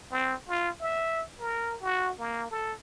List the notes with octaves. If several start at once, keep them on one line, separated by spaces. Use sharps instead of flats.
C4
F4
E5
A#4
F#4
A#3
A4